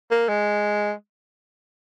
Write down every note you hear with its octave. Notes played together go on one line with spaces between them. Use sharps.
A#3
G#3